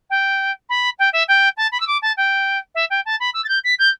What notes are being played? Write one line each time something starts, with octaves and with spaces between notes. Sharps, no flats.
G5
B5
G5
E5
G5
A5
B5
E6
D6
A5
G5
E5
G5
A5
B5
E6
A6
G6
B6
G6